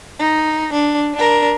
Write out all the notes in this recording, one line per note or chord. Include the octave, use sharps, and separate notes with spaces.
D#4
D4
D4 A#4